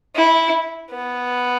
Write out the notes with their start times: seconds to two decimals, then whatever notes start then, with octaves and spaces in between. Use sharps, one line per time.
0.16 E4
0.91 B3